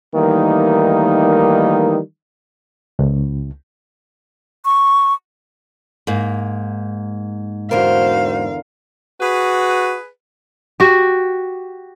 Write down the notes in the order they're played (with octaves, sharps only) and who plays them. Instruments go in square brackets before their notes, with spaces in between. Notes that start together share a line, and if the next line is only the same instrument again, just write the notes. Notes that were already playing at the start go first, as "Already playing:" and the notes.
[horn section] D#3 E3 G3 A3 A#3 D#4
[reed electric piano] C#2
[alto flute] C#6
[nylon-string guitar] G#2 A#3
[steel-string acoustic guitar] E2 D3 A#4 [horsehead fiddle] F#4 C5 [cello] F5
[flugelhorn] F#4 [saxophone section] G#4 B4
[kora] F#4 G4